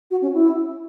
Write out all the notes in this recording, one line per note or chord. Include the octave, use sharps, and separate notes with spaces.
F#4
C#4
E4